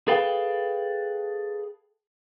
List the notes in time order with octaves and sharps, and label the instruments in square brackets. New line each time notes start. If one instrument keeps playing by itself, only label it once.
[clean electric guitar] G#4 A4 B4 F5 G5